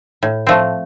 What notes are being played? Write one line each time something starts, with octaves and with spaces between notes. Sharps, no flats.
A2
F3 A3 C4